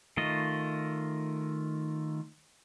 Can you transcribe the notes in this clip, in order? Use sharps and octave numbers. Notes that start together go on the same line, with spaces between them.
D#3 A3 F4 D#5